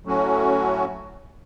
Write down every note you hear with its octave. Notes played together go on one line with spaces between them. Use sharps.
A2 F#3 A3 C#4 F#4